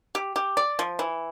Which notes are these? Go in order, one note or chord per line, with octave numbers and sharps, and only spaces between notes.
G4
G4
D5
F3
E3